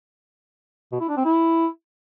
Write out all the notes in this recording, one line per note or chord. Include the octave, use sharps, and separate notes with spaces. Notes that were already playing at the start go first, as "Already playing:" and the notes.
B2
E4
D4
C4
E4